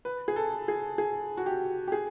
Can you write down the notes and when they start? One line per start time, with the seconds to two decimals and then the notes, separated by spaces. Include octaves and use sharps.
0.05 B4
0.28 G#4
0.36 A4
0.68 G#4
0.98 G#4
1.37 F#4
1.46 G4
1.87 G4
1.92 G#4